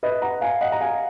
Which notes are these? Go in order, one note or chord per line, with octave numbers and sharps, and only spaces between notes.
B4 D#5
F#5 A#5
F5 G#5
D#5 F#5
A#5
F5 G#5